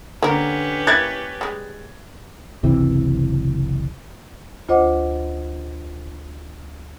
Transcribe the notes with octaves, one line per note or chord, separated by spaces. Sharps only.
D3 A#3 C#4 G4 A#4 B4
A#3 E4 F#6 G#6 A6
G3 G#3
F#1 C#2 C3 E3
D2 F4 C5 D#5 F#5 D6